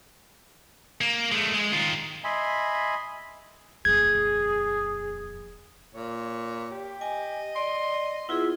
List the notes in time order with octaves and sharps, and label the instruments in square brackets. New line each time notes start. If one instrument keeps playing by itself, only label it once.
[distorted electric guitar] A#3
G#3 A3
G#3
D#3 F4
[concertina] D#5 E5 G#5 B5 C6
[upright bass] D#1 F2 [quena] G#4 [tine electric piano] G#6
[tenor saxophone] A#2 [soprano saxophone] C#5
[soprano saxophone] G4
[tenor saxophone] D#5 [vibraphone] G#5
[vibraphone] D5 [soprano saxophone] C6
[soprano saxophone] B3 [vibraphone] E4 F4 G#4 [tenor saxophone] E5